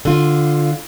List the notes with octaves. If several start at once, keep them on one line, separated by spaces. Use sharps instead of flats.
D3 F4